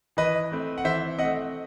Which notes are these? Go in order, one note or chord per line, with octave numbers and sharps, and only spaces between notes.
E3 B4 D#5
A3 C4
F#5
E3 C5 E5
A3 C4 D#5 F#5